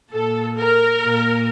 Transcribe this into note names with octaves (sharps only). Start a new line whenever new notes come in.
A#2 A4
A#4
A#2